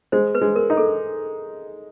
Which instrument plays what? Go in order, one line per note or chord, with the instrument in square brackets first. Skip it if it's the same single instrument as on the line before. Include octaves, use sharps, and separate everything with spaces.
[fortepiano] G#3 [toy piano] C5
[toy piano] B4
[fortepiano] G#3
[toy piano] A#4
[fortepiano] D#4
[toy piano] A4